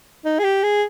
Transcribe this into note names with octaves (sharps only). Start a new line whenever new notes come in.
D#4
G#4
G4
G#4